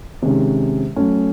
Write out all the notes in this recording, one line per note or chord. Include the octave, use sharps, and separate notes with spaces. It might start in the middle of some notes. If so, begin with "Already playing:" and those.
C3 D#3 G#3 C#4
F#3 A3 C#4